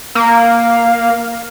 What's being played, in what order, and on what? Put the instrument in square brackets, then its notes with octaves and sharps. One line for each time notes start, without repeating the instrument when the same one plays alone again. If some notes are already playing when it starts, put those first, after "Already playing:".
[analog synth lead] A#3